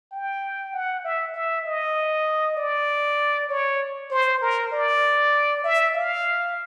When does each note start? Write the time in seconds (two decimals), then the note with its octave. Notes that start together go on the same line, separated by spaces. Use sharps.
0.12 G5
0.73 F#5
1.04 E5
1.34 E5
1.66 D#5
2.57 D5
3.49 C#5
4.11 C5
4.41 A#4
4.72 D5
5.64 E5
5.95 F5